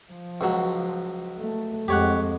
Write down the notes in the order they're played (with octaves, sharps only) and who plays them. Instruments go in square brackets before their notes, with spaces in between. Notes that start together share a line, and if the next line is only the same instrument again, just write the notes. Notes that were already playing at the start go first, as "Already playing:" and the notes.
[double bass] F3
[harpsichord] C#2 F#3
[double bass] A3
[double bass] F2 G#3 [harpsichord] G4 C#5 F#5